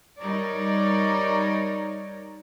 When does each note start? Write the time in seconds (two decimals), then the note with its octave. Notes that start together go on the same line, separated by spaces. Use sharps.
0.20 G3 D#4 A#4 C#5 D5